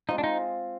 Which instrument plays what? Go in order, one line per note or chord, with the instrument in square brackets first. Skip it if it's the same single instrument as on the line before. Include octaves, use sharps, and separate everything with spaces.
[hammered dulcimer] G#3 C4 F4 [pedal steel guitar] D#4
[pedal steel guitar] D4
D#4